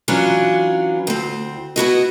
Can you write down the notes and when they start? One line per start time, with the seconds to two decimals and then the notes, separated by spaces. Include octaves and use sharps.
0.08 E3 F#3 C#4 D4 F4
1.07 D2 C4
1.76 B3 E4 F#4 D#5